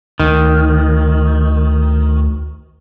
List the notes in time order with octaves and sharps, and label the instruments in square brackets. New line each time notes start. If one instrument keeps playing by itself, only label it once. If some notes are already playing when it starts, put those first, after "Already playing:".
[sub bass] D2 [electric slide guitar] D#3